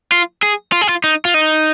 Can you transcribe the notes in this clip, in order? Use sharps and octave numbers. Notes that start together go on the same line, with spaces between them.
F4
G#4
F4
G#4
F4
D#4
F4
D#4